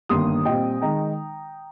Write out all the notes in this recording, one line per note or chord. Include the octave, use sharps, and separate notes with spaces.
G1 G2 D#3 A#3 C6 D#6
A#2 G3 C4 D#5 G5
D#3 G#3 D#4 G5 A#5